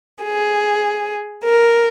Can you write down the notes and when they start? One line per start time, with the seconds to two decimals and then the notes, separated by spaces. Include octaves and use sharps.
0.24 G#4
1.45 A#4